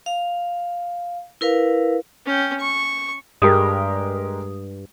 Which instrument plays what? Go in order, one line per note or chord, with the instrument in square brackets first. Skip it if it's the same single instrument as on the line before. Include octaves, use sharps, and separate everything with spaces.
[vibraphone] F5
E4 A#4 B4 F5
[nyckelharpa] C#4 G5
C#6
[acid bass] G2 [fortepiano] G#3 G4 A#4 [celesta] D#6